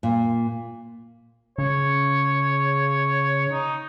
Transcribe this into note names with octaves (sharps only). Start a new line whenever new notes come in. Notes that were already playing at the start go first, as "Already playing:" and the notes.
A#2
C#3 C#5
D#4